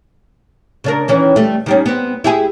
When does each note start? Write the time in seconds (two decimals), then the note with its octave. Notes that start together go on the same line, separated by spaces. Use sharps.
0.84 C#3 D4 A#4
1.08 D#3 E3 C#4
1.36 G3 A3
1.66 D#3 G3 C#4
1.86 B3 C4
2.24 E4 G4 G#4